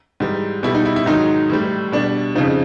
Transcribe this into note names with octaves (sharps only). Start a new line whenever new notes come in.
G#2 E3 G3
B2 G3 E4
D#4
E4
E4
G#2 D#3 F#3 D#4
A2 E3 G3
B2 G3 D4
F2 C#3 F3 D#4